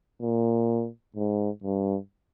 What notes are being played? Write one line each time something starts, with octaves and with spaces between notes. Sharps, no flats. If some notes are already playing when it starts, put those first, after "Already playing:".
A#2
G#2
G2